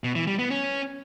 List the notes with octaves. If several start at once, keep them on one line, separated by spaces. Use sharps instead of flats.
B2
E3
G3
B3
C#4